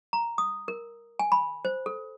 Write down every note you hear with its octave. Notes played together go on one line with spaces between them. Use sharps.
A#5
D#6
A#4
G#5
B5
C5
A4